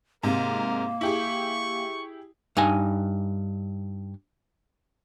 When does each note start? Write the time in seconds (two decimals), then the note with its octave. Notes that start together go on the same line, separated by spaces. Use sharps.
0.23 G#2 C3 A#3 A#4
1.01 E4 G4 G#4 C#6
2.57 G2 D#4 G#5